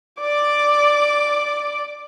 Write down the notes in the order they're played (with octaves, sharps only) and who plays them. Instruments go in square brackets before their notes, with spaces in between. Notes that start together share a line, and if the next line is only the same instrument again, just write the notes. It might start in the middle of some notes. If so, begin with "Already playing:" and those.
[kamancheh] D5 D6